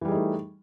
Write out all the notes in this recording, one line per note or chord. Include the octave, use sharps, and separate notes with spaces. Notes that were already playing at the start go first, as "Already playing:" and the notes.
E3 G3 A3 D#4 G#4